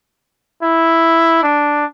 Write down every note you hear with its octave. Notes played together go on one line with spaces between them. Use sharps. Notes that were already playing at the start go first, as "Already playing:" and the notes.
E4
D4